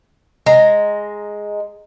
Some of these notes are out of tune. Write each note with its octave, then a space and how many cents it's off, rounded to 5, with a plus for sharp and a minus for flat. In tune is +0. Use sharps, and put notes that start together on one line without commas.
G#3 +0 A#5 -5